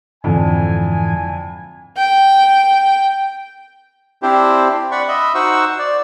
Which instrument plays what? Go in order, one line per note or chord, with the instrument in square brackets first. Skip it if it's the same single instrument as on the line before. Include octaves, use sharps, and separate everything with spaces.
[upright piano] F2 D3 [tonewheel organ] G#2 E3 [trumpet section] G#5
[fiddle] G5
[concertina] C4 D4 E4 G4 C5
D5 F#5 B5 C#6
D#5 E5 B5
D#4 F#4 C5 F#5 C#6 E6
D5